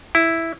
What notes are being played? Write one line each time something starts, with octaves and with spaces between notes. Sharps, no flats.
E4